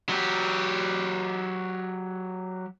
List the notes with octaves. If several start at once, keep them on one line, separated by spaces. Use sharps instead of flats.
F#3 G4